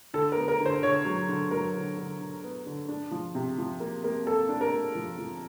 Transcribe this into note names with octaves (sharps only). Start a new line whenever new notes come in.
D3 A4
A#4
B3
A#4
D3 C5
D3 C#5
F#3
D3
F#3 A#4
D3
D3
D3
B3
D3
D4
F3
C3
F3
A#3
A#3
A#3 A4
D4
A#4
A#3
F3
F3